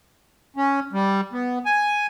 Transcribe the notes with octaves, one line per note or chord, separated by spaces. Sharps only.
C#4
G3
B3
G#5